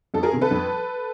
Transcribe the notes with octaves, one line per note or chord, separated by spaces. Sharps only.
F2 A4
G#4 A#4
C3 D#3
A4 B4
F2